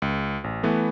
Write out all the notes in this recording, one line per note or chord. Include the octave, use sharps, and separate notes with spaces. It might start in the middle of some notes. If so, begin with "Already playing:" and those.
C#2
A1
E3 A3 B3